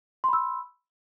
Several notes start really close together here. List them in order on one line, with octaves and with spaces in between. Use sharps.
C6 B5 E6